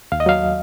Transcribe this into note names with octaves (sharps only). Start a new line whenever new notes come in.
D#2 F5
D#5
F#3 F5